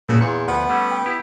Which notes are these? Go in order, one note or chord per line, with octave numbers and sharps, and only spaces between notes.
A#2 C#3 A3 F#4
E2 A#2 C#7
D2 F3 B3 F#5
G3 A3 C#4
G5
E4 G4